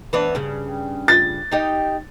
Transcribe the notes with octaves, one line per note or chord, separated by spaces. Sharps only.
E3 B3 D4
G2 C#3
A6
D#4 G4 D#5